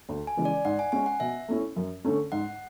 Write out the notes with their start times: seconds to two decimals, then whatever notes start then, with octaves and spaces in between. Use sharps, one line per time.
0.09 D2
0.27 G#5
0.37 C#3 E3 G#3
0.45 D5
0.65 G#2 F#5
0.79 G#5
0.92 G#3 C#4 G#5
1.06 F#5
1.20 B2 E5
1.48 A3 C#4 E4
1.76 F#2
2.05 D3 A3 C#4
2.32 G#2 F#5